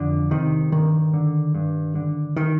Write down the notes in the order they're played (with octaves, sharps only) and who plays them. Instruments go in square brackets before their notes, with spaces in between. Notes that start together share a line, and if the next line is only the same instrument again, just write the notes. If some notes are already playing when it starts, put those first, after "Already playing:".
Already playing: [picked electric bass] F2 D3
C3 D#3
G2 D#3
D3
G2
D3
D#3